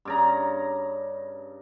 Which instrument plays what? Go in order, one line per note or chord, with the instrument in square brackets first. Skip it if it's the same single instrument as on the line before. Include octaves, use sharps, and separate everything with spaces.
[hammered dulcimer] G2 C#3 A#5